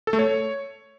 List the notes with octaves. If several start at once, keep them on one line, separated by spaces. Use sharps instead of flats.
A4
A3
C#5